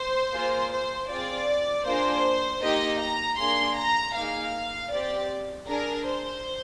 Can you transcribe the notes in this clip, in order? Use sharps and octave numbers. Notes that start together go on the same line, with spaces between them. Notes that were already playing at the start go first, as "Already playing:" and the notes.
Already playing: C5
A#3 F4 G#4
C5
C4 F4 G#4 D5
A#3 D4 F4 G#4 C5
A#3 D#4 G4 D#5
A#5
A#3 D4 G#4 C6
A#5
A#3 D#4 G#4 F5
C4 G4 D5
D4 G#4 A#4
C5